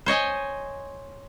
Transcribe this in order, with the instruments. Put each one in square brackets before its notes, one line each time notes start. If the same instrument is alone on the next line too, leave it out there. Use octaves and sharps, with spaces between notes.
[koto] C5 C#5 D#5 G#5